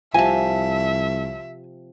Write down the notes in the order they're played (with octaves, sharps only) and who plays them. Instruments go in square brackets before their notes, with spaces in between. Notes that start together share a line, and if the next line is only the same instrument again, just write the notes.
[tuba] C2 [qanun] C3 F3 [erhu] E5 [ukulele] G#5 A5